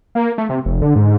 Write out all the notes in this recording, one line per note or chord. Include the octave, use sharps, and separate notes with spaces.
A#3
A3
C3
F1
D3
G#2